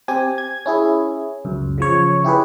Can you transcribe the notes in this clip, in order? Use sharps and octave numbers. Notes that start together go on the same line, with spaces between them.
C4 G4 G#5
G#6
C#4 E4 G#4
C#2 F#2
C#3 F3 C#5
E4 G4 G#4 B4